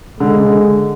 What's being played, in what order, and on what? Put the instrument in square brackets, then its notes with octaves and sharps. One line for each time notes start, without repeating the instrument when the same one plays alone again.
[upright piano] D3 [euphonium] G#3
[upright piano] C#3
D3